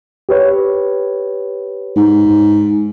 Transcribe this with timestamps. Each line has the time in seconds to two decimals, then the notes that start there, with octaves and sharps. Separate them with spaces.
0.29 G4 B4 C#5
1.96 G#2